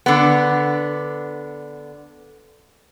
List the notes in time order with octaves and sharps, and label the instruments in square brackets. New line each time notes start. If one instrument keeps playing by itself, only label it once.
[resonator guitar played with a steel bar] D3 B3